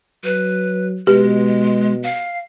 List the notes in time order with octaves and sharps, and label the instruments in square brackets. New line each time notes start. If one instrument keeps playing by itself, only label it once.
[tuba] F#3 [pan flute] B4
[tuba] B2 [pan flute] G#3 [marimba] G4 B4
[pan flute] F5